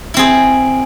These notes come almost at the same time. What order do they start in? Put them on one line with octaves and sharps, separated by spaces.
E4 C4 G#4